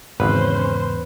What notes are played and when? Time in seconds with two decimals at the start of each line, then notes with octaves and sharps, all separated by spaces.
0.20 G#1 E2 G#2 C#3 C#4 B4 C5